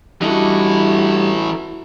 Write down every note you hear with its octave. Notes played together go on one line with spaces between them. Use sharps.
E3 G3 D4 E4 F#4 A4 D#5